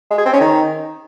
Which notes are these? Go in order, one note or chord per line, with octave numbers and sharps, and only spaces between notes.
G#3
G#4
C4
C#4
D#3